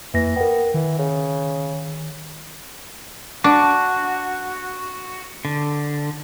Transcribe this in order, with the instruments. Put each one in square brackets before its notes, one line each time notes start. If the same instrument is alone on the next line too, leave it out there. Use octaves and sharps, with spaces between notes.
[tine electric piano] F2 A#3 A#6 [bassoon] E3
[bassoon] B3 [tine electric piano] A#4 G5
[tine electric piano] D#3 [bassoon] E3
[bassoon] C#3
[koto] D4 [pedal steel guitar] F#4
[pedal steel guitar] D3